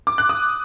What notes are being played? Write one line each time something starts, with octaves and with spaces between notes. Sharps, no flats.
D6
F#6
D#6